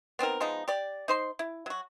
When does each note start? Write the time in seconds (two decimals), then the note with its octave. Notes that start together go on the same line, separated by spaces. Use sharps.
0.19 B3 C4 D#4 A#4
0.40 F3 G#3 B3 D#4
0.68 G4 D5
1.08 D#4 C5 C6
1.39 E4
1.66 F#3 F#4